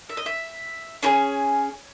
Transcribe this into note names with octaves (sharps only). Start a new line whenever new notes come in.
E5
D#5
E5
C#4 E4 G#4 C#5